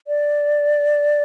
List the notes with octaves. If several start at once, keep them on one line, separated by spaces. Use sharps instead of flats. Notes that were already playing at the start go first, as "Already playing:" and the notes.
D5